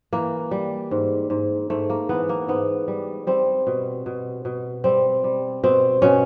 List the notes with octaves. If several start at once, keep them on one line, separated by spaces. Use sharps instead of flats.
E3 A#3
G3
G#2
G#2
G#2 A3
A#3
E3 B3
A#3
G#2 B3
G3
G3 C4
B2
B2
B2
G3 C4
G3
B2 C4
B2 C#4